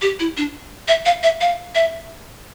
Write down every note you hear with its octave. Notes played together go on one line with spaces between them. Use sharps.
G4
E4
D4
E5
F5
E5
F5
E5